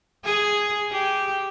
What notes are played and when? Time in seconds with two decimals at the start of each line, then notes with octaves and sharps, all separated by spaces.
0.25 G#4
0.92 G4